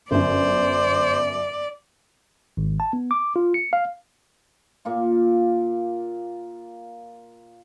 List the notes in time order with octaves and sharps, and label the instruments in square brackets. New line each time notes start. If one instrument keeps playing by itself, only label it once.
[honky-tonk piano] G1 F#2 [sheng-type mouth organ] C5 [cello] D5
[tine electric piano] G#1
A5
B3
D6
F4
C#7
F5
[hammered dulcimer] A#2 A#3 F4